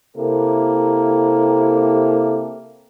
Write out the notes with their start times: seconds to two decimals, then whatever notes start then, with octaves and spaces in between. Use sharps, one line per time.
0.16 C3 A#3 E4 G4 A4